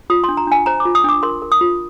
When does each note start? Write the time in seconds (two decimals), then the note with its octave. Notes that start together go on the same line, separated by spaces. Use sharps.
0.10 F4 D#6
0.24 D4 C6
0.37 A#5
0.47 D4 G#5
0.66 C5 A#5
0.80 D6
0.85 F4
0.95 D#6
1.04 D4 D6
1.23 A#4 C6
1.42 A#4
1.52 D#6
1.61 F4